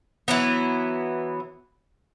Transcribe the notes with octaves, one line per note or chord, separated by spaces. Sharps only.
E3 F#3 B3